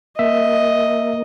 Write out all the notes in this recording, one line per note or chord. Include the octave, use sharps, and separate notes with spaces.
A#3 D#5 E5